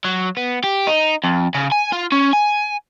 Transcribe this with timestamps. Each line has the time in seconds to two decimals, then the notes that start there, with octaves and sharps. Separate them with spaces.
0.05 F#3
0.37 B3
0.64 G4
0.87 D#4
1.24 F2
1.55 C#3
1.72 G#5
1.92 F4
2.12 C#4
2.33 G#5